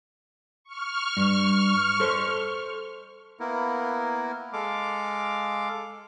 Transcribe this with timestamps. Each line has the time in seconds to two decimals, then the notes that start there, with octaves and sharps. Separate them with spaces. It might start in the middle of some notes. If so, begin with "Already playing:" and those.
0.64 C#6 F6
1.17 G2
2.00 A4 C5
3.40 A#3 B3 E4 A#4
4.53 G#3 A4 F5 D6